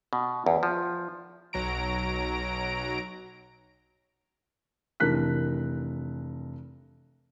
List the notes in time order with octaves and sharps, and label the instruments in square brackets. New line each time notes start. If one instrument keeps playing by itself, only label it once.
[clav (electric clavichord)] B2
E2
F3
[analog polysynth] B1 F#3 A#5 D7
[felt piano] F1 E3 D4 A#4 F#6 B6